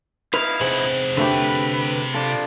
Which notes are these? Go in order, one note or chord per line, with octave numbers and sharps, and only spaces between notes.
D#4 E4 B4 F5
C3 G#4 C5 F#5
D3 A3 G4 B4 G5 B5
D4 F4 A4 D5